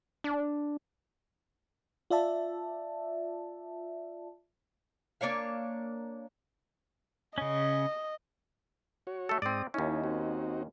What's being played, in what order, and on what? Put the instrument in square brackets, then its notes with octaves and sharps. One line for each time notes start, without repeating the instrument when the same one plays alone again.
[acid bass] D4
[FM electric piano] F4 D5 E5 A5
[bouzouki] A#3 D4 C#5 F5
[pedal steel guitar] C#3 C#4 [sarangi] D#5
[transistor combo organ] F#4 C#5
[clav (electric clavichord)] A3 A4
[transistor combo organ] G#2 D#6 [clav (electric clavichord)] C4 D5
[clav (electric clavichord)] D#2 C#4 [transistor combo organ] D#4 E4
[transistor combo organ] C4 D#4 F#4